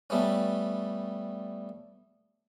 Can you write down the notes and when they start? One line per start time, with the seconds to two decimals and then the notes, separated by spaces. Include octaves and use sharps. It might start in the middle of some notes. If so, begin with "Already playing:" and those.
0.10 G3 A3 B3 C#4